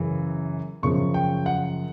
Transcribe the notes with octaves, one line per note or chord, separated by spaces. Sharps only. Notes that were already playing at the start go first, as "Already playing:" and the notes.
Already playing: F#2 C#3 E3
F#2 C#3 F3 C#6
G5
F#5